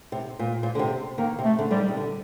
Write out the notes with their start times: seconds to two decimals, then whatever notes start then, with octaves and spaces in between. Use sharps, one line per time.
0.12 C3
0.39 A#2
0.63 A#2
0.75 D3
0.79 C3
1.18 D#3 A#3
1.39 C3
1.44 A3
1.59 D3
1.71 D3 G3
1.78 D#3
1.88 C3
1.97 D3